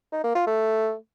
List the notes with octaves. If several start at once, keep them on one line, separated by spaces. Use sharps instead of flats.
D#4
A#3
F4
A3